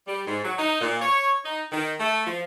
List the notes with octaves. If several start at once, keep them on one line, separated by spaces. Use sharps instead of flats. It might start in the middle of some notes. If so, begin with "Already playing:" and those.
G3
G#2
F#3
D#4
A#2
C#5
D#4
D#3
A3
F3